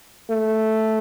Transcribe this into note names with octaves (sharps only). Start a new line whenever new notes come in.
A3